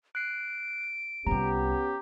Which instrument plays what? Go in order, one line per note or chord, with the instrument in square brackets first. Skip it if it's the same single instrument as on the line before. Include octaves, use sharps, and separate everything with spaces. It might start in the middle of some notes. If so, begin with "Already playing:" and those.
[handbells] F#6 C7 [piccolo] D7
[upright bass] C2 F4 [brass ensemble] B3 C#4 G4 [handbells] A#5